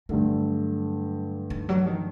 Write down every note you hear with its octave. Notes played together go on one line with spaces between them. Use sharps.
G2 D3 F#3 A3
D#3
F#3
D#3